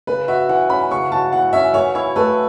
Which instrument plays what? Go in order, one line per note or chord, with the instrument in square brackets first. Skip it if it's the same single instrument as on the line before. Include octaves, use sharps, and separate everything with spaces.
[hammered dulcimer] C#3 [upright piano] B4
[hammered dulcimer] F#4 [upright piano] E5
[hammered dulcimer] E3 [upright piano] F#5
[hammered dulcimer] C#4 [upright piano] B5
[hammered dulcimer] C#3 [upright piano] C#6
[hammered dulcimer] F#4 [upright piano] A5
[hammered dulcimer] E3 [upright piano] F#5
[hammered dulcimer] C#4 [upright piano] E5
[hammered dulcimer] E3 [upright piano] C#5
[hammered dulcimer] E4 [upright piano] C#5
[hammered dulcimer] A3 [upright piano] B4